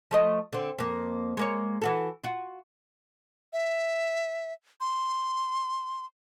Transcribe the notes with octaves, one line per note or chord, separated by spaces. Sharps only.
F3 A3 D#5
D3 C4
F2 A#3
G#3 A#3 C#5
E3 F#4 A4
F4 F#4
E5
C6